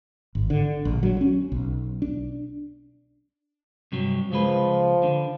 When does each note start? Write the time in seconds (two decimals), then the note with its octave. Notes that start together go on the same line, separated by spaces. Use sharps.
0.35 G#1
0.50 D3
0.85 A#1
1.03 F#3
1.21 C#4
1.52 B1
2.02 D4
3.92 G2 C3 F#3
4.32 C#2 F3 G#3 B4
5.03 D3